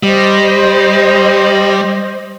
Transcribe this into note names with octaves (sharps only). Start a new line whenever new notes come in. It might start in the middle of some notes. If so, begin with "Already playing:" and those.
G3 C5 D#5